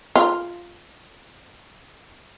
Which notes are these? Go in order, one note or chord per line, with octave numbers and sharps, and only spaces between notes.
F4